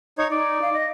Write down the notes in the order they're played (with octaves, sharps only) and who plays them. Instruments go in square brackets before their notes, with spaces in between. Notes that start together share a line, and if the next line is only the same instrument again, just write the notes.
[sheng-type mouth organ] D#4 C#5
[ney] D#4 [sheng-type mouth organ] D5
[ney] F5
D#5